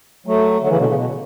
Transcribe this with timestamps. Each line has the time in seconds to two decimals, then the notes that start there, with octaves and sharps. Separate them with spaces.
0.26 F#3 A3
0.60 D3 F#3
0.69 C#3 E3
0.77 B2 D3
0.87 C#3
0.95 B2